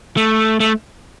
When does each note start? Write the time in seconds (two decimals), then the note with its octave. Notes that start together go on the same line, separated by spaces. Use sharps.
0.17 A3
0.60 A3